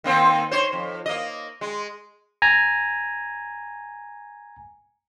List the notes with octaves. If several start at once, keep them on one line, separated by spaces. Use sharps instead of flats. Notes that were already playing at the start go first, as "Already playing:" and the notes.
D#3 A#3 C4
C5 C#5
F2
A#3 D#5
G#3
G#5 A#5